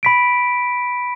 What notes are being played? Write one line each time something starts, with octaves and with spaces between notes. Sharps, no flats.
B5 B6 D7